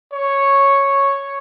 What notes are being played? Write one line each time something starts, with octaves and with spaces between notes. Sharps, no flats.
C#5